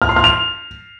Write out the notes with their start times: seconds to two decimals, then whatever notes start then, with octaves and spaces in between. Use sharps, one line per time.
0.02 F6
0.09 C6
0.16 F6
0.24 F7